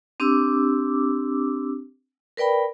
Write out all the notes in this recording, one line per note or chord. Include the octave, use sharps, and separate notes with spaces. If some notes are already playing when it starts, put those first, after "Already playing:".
C4 D4 G4 D6 E6
A#4 B4 D5 G5 B5